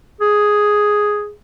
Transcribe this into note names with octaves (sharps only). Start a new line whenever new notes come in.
G#4